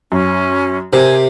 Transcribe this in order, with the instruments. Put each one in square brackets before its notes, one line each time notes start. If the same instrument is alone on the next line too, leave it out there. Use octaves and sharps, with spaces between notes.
[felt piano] F#2 [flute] C#4
[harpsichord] C3 [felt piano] G4 A#4 C5 [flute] G#5